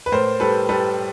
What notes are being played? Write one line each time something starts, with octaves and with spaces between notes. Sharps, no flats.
B4
A2 A#4 C5
G3 A4 B4
G3 A4 B4